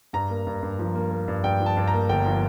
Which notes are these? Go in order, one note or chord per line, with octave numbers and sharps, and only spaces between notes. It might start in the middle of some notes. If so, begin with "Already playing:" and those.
G2 A#5
A#3
G2
G2
F3
A#3
A#3
G2
G2 G5
F3
A5
G2
A#5
A#3
G1 G5
F3